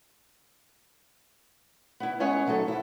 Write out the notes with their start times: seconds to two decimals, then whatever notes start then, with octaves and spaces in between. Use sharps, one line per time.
2.00 B3 E4
2.20 G#3 B3 C#4 C#5 F#5 G#5
2.47 D2 F#3 D#4 A4
2.68 D2 E4